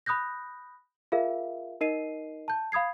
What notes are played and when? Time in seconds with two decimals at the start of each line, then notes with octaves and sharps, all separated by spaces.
0.06 B5 D#6 F#6 G6 A#6
1.12 F4 G#4 A#4 E5 F5
1.81 D#4 A#4 D#5 C7 D#7
2.48 A5 G6
2.72 F5 B5 D#6 G#6 C7